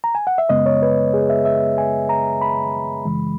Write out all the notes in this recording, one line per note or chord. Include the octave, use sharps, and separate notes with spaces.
A#5
G#5
F#5
E5
F#2 C#3 G#3 B3 D#5
C#5
B4
G#4
E5
E5
G#5
A#5
B5
F#2 C#3 E3 G#3